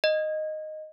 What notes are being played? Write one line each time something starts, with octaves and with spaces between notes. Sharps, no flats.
D#5